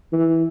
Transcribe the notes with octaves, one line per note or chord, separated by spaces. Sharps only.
E3